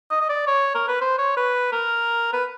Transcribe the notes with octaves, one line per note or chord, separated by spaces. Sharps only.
D#5
D#5
D5
C#5
A#4
B4
C5
C#5
B4
A#4
B4